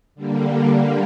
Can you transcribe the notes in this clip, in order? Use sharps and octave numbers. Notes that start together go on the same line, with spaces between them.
D3 G3 A#3